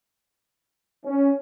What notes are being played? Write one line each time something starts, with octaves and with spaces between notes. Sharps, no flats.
C#4